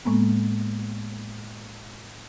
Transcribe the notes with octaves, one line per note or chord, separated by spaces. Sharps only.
A2 G#3 A#3 B3